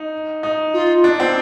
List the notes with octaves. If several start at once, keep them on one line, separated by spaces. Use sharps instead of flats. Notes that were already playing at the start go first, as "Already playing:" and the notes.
Already playing: D#4
D#4
F4
D4
C4